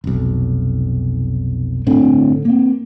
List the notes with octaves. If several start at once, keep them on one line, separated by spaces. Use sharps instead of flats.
F1 B1
G1 A2 D3 C4
A#3 C4